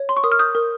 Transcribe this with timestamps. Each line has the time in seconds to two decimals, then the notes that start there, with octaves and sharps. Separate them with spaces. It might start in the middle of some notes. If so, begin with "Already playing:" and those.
Already playing: C#5
0.09 C6
0.17 C#6
0.24 A#4 D#6
0.32 F6
0.39 D#6 G6
0.55 A#4